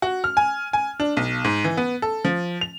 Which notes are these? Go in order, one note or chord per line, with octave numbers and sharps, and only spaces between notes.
F#4
F6
G#5
G#5
D4
B1
G#2
E3
B3
A4
F3
F7